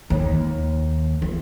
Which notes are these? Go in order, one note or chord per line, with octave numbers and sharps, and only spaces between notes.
D#2
E2